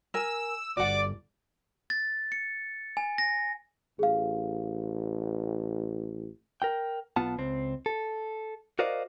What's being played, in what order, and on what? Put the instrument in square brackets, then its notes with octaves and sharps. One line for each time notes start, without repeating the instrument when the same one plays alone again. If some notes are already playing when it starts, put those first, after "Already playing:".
[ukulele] A#4 G#5 [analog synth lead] E6
[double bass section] G1 [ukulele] F#4 F#5 [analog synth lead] D5 [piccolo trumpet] D6
[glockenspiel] A6
C#7
G#5
A#6
[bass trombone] A1 [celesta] G#4 F5
[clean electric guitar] A#4 G5
B1 B3 F4 F#5 A5
C#2 C4
A4
F#4 A#4 C5 D5 D#5 F5